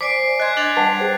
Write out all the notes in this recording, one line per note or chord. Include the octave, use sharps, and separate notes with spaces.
C5 D5 G#5 D6 B6 C7 D7
D#5 G#5 C6 F#6 G#6
D4 F#6 A6 F7
G3 B4 F#5 G5 A5
G#4 C5